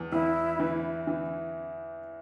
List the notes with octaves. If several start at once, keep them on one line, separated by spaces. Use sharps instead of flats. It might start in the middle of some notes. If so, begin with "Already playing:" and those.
Already playing: E2
E2 E4
E3
E3